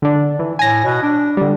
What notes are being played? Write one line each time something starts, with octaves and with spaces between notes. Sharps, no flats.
D3 D4
E3
A2 G#5 A#6
B2
D4
D3 G3